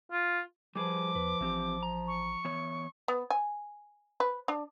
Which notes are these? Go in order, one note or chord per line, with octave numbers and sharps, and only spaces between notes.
F4
F3 G3 G#4 B4 D6
E2 B4
A1 E3 C4 G4
A#5
C#6
E3 B3 C#5
B3
G#5
B4
D4